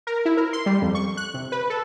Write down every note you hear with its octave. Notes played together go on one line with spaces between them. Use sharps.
A#4
E4
A#4
C6
G3
F2
C#6
F#6
C3
B4
A4